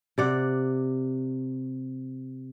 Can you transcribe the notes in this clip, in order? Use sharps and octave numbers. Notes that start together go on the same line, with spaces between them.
C3 D5 F#5